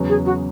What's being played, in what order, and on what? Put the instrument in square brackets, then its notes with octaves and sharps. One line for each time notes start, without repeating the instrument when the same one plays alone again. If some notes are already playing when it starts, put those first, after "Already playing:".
Already playing: [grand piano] E2 C#3 F#3 B3
[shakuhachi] G#4
F#4